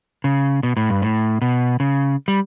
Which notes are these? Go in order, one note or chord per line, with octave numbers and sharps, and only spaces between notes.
C#3
B2
A2
G2
A2
B2
C#3
G3